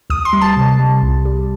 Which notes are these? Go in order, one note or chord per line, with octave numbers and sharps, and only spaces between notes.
D2 D#6
C6
G3
A5
C3
G3
C2
G3